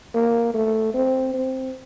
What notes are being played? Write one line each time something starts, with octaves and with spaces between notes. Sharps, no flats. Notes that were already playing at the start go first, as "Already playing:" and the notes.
A#3
A3
C4
C4